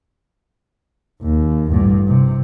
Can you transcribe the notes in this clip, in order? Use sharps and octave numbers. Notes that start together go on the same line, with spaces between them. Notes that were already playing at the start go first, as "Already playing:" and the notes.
D#2
A1 G2
C3